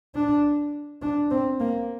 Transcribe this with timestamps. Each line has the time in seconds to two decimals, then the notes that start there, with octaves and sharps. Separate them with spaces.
0.15 D4
1.02 D4
1.31 C4
1.60 A#3